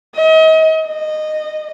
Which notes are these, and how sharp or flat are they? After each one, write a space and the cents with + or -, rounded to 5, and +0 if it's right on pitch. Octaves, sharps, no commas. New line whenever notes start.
D#5 +40
D#5 -15